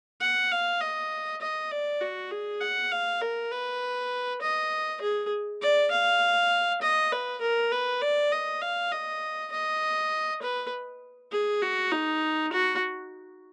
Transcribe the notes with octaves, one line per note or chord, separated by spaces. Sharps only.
F#5
F5
D#5
D#5
D5
F#4
G#4
F#5
F5
A#4
B4
D#5
G#4
D5
F5
D#5
B4
A#4
B4
D5
D#5
F5
D#5
D#5
B4
G#4
F#4
D#4
F#4